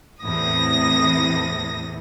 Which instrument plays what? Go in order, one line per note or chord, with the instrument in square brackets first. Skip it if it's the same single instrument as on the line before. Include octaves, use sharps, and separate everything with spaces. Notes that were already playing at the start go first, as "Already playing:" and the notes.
[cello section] E2 A2 C3 [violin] D#6 A#6